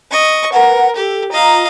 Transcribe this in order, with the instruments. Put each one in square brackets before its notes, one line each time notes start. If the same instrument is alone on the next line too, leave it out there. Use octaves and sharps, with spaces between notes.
[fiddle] D#5 C#6
[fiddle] A#4 [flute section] B4 F#5
[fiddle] G4 [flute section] A4
[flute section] F4 A#5 [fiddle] D#5 F5